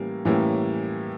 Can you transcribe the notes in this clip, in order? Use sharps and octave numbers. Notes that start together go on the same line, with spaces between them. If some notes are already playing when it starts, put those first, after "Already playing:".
Already playing: A2 E3 G3 A#3 C#4
A2 E3 G3 A#3 C#4